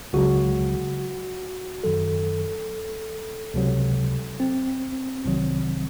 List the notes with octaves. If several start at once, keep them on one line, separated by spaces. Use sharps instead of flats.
C#2 C#3 F#3 F#4
F#2 D#3 F#3 A4
C#2 C3 F#3
C4
C2 C3 D#3 F#3 C4